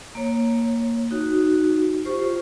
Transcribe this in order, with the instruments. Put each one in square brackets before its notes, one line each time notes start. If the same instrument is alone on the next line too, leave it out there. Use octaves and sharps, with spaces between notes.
[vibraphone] A#3 C#5
D#4 F#4
F4 G4 C5 C#6